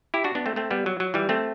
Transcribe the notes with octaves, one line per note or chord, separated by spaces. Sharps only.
E4 G4
D4 F#4
B3 D4
A3 C4
A3 C4
G3 B3
F#3
F#3
E3 G3
A3 C4